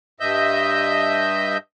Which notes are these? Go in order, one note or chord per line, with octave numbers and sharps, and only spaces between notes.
G2 D#5 E5 G6